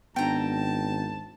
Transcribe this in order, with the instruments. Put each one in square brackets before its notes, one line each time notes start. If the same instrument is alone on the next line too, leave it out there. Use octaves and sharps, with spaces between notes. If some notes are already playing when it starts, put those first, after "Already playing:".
[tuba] G#1 [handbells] B3 D4 [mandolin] G5 A#5 [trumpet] A5